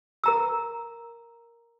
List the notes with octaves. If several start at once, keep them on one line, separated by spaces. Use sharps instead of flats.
A#4 A#5 E6